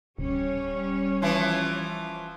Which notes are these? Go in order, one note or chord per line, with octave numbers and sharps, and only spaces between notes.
D1 G3 C#4 C#5
E3 F3